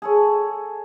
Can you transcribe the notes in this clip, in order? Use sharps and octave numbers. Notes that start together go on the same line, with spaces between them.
G#4 A4 C#5